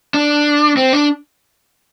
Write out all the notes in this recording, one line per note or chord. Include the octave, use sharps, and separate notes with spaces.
D4
C4
D4